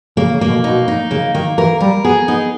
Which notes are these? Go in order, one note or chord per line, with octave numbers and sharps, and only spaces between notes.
C#3 A#3
C#3
A#3
B2
B2 D#4
D#4
C#3 A#3
D#3 A#3
E3 A#4
G3 A#4
B3 G#4
B3 D#4